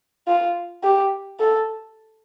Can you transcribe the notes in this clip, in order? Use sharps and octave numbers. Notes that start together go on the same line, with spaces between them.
F4
G4
A4